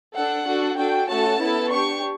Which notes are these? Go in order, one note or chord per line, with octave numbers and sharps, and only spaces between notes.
D4 A4 F#5
D4 F#4 A4
D4 F#4 A4 G5
A3 C#4 F#4 A4 A5
B3 E4 A4
D4 G4 C#6